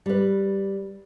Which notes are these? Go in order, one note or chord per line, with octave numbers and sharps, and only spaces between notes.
G3 B4